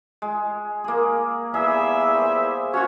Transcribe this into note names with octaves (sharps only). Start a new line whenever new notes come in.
G#3
A#3 G#4
E2 G3 G#4 E5
C5
C#4 F4 F#4 C#5